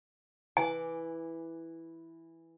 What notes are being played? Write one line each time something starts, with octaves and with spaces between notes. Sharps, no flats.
E3 G#5 D6